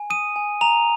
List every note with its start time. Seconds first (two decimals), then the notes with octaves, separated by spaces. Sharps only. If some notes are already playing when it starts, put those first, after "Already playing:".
Already playing: G#5
0.10 D#6 D#7
0.36 G#5
0.61 A#5 F7